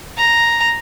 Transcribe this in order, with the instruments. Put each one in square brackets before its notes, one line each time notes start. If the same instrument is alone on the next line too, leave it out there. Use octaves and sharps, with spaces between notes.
[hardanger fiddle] A#5